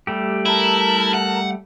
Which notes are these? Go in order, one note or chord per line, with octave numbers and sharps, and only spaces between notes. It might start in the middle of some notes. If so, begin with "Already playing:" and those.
G3 A3 G4
E4 A#4 A5
F#5